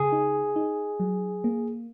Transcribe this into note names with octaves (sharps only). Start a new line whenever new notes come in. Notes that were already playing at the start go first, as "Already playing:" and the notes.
Already playing: C#3 G#4
D#4
D#4
F#3
A#3